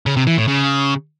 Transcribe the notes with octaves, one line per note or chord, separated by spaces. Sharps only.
C#3
C3
E3
A2
C#3